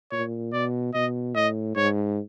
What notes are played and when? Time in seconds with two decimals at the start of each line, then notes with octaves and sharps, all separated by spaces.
0.11 A#2 C#5
0.53 B2 D5
0.94 B2 D#5
1.35 A2 D#5
1.76 G#2 C#5